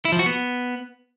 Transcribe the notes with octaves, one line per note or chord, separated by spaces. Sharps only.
E4
F3
F#4
B3